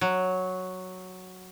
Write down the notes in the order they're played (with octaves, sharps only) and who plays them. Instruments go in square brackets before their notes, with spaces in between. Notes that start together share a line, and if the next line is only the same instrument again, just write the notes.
[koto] F#3